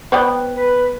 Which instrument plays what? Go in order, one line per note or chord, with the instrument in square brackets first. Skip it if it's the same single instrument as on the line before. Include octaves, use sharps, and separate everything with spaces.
[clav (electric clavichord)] B3 [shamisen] C5 D5 G5
[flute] B4